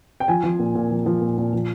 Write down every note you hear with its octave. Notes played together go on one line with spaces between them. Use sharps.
G5
F3 G#5
F3
A#2
A#2
F3
F3
A#2
A#2
F3